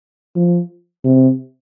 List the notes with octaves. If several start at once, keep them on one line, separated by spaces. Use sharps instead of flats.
F3
C3